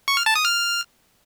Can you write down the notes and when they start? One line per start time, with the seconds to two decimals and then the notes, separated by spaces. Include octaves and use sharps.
0.08 C#6
0.17 F6
0.26 A5
0.35 D#6
0.45 F6